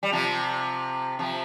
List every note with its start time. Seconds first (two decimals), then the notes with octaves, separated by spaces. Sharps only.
0.03 G3
0.12 C3 F3
1.19 C3 F3